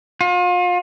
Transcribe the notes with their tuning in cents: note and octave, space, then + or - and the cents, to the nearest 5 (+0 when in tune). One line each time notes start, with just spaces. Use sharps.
F4 +35